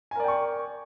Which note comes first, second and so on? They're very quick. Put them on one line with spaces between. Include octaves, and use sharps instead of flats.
G#5 A#4 D5 G5 C#6